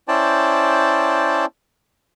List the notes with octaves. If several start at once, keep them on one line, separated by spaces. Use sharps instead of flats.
C#4 E4 C5 D5 G5 A5